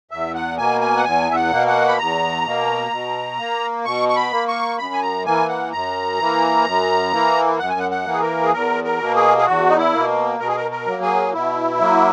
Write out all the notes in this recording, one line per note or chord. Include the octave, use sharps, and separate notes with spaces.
E2 E5
F#5
B2 A#3 G#5
G#5
F#5
E2 G#5
E5
F#5
B2 A#3
F#5
B5
E2 A#5
B2 A#3
B2
A#3
B2 C#6
C#6
B5
A#3
C#6
F#2 B5
G#5
A#5
E3 A#3 G#5
F#5
F#2 A#5
E3 A#3
F#2
E3 A#3
F#2 F#5
G#5
F#5
F#5
E3 A#3
G#4
A#4
G#4
E2 A#4
A#4
B2 A#3
G#4
G#4
E2 F#4
D#4
E4
B2 A#3
B2 A#4
G#4
A#4
A#4
F#3 A#3
G#4
B2 E4
F#3 A#3